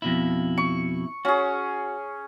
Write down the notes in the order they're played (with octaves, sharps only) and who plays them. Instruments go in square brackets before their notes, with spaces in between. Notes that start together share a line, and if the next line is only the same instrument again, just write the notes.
[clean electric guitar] F2 B2 E4
[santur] C#6
[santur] C#4 G#4 [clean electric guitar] F#4